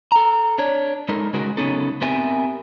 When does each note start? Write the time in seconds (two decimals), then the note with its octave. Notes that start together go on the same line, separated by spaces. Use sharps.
0.12 A4 A#5
0.58 D4 C#5
1.09 G#3 D#4 A4 A#4
1.33 C#3 G#3 F#4 A#4
1.57 C#3 F#3 B3 C#4 D#4 A4
2.02 B3 C4 G4 A#4 E5 G#5